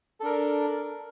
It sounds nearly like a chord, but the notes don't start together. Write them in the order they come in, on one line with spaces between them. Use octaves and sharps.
A4 D4 A#4